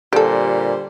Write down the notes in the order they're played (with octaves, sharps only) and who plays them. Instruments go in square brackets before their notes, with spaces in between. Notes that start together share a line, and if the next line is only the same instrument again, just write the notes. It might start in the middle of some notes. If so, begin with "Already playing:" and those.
[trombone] A#2 [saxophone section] D3 G3 C5 [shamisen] G4 A4